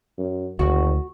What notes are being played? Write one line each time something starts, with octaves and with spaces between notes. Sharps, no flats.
F#2
F#1 D2 F#4